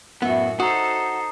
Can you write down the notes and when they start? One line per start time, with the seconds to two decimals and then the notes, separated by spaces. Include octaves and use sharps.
0.22 F#2 A2 B3 E4 F#4 E5
0.60 D#4 F#4 A4 C5 A#5 D#6